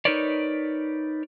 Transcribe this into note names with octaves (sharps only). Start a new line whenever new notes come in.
D#4 E4 A#4 B4 C#5 D5